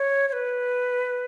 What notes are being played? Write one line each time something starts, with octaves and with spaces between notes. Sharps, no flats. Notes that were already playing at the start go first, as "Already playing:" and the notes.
Already playing: C#5
C#5
B4